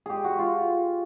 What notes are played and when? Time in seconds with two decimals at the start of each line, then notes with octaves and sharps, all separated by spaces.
0.06 G#3 G4 G#4
0.24 G#3 F#4
0.39 G#3 F4